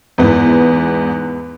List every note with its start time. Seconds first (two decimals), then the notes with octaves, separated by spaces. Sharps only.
0.18 E2 G#2 B3